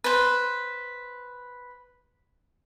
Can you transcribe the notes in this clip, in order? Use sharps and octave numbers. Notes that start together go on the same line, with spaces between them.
B4 C5